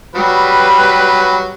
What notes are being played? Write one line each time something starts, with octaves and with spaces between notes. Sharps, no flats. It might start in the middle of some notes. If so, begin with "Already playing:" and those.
F#3 G3 B4